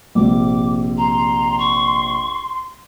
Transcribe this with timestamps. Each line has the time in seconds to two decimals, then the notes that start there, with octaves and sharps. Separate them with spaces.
0.15 A#1 C3 D6
0.98 A#5 C6
1.58 C#6